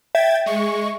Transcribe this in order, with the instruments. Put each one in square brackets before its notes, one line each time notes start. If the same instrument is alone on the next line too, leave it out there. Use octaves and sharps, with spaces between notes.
[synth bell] E5 [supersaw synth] G5 G#6 A6
[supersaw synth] G#3 C#6